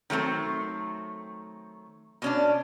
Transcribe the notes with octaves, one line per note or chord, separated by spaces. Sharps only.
D#3 F#3 A3 C4
B2 C#4 D4